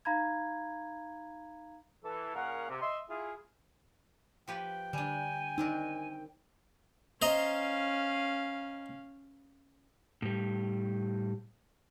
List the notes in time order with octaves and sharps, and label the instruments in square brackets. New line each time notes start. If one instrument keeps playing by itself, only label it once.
[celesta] D#4 F5 A#5 B5 G#6
[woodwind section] E3 A4
A#2 C#4 G#4 A#4 F5 F#5
C3
D#5 E5 C6
E4 F4 G#4
[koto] F3 G4 B4 [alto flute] G5
[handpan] D3 [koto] G3 D4 [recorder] G#5
[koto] C4 D4 A#4 [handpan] D#4
[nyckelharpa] C#4 F5 [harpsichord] C5 D#5 A#5
[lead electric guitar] A2 G3